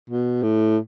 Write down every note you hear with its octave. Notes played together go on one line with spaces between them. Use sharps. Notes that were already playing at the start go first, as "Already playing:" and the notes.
B2
A2